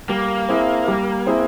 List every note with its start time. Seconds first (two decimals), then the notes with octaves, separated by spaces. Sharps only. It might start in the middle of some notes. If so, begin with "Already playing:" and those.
0.09 G3 A#3
0.49 C4 E4 G#4
0.88 G3
1.27 C4 E4 G#4